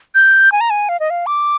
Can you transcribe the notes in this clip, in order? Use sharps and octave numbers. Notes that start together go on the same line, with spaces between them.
G6
G#5
A#5
G#5
F5
D#5
F5
D6